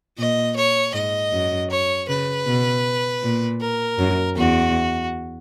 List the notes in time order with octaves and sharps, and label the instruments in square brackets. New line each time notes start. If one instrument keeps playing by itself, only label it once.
[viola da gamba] A#2 [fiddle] D#5
[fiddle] C#5
[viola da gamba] G#2 [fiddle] D#5
[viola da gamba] F#2
[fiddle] C#5
[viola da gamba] C#3 [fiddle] B4
[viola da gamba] B2
A#2
[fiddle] A#4
[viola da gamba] F#2
[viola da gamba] E2 [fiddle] F#4